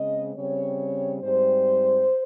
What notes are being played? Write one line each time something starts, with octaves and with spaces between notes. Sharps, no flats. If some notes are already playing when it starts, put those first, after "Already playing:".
Already playing: C#3 G#3 C4 D#5
C#3 G3 C4 C#5
G#2 G3 C4 C5